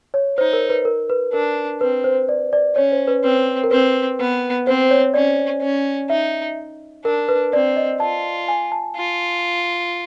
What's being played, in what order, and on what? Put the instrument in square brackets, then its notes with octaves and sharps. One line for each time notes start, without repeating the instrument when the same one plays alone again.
[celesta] C#5
[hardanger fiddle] D#4 [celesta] C5
[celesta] A#4
B4
A#4
B4
[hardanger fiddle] D4 [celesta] A#4
[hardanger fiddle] C4 [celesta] B4
[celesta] C5
D5
D5
[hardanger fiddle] C#4 [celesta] C#5
[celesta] C5
B4
[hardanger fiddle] C4 [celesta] B4
[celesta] A#4
[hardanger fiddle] C4 [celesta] B4
[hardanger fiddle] B3 [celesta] B4
[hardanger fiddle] C4 [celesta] C5
[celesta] C#5
[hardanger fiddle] C#4 [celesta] D5
[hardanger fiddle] C#4
[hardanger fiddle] D#4 [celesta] E5
[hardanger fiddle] D4 [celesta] A#4
[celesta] B4
[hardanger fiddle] C4 [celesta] D5
[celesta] D#5
[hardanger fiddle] F4 [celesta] A5
[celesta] G#5
A5
[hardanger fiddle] F4